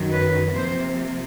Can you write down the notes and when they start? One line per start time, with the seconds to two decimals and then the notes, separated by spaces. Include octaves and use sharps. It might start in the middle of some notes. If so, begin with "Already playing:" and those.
Already playing: F#2 D#3 F#3
0.11 B4
0.55 C3 F3 A#3 C5